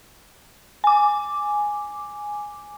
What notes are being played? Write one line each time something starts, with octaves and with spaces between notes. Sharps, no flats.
G#5 D6